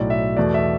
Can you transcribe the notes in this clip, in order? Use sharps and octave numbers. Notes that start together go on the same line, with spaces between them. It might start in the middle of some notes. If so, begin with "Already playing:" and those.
Already playing: B1 A2 F#3 D5
E5
E2 B2 A3 D5
E5